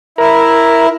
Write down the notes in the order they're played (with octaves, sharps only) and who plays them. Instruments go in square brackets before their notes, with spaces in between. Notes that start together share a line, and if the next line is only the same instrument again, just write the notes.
[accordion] E4 [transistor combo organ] A#4